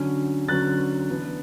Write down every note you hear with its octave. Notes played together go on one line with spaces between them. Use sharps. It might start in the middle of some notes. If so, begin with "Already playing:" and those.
Already playing: D3 F#3 C#4
D3 F#3 C#4 F#6 A6
E3 B3 D4